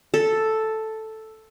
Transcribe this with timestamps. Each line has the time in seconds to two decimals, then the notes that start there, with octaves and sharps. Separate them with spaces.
0.14 A4